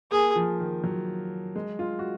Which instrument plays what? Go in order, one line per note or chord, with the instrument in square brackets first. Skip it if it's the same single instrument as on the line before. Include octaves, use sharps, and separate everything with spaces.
[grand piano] A#3 [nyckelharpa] G#4
[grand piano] F3
D#3
F#3
G#3
F4
F#4